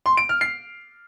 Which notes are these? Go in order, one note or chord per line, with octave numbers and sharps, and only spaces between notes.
C6
D7
F6
C7